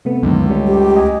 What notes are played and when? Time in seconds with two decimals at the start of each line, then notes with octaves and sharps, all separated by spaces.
0.05 C3 A3 B3
0.23 C#2 F#2 D3 D#3
0.50 G3 A3 C#4
0.67 G4
0.96 D#5 G#5